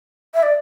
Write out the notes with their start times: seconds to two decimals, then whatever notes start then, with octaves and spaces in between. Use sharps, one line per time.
0.34 E5
0.43 D5